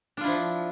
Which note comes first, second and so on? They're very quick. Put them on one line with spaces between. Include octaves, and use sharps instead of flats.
D4 F4 E4 F3